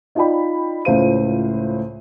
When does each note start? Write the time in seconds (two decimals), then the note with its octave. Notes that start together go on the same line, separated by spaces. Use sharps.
0.15 D#4 F4 D5 D#5 G5 B5
0.85 C#2 A2 F4 C5 F5 D#7